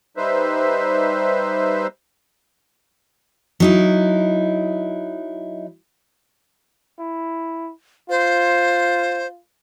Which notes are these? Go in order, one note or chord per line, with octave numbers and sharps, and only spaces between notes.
G3 D#4 B4 C5 E5
F#3 D#4 E4
E4
F4 C5